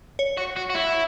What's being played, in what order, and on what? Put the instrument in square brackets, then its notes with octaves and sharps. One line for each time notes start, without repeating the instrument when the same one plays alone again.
[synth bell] C#5
[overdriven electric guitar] F#4
F#4
F#4
E4